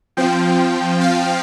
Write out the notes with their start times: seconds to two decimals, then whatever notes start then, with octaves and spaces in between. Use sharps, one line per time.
0.17 F3 C4 F4 G5
1.01 F5